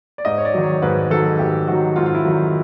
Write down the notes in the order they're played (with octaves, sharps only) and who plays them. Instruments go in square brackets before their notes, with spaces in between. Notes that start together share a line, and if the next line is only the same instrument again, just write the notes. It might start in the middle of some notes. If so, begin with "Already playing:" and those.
[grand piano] D5
G#2 D#5
C#5
D5
D#3 F#3
C#5
G#2 B4
D#3 F#3 A4
G#2 G4
D#3 F#3 F#4
G#2 F4
F4
E4
D#3 F#3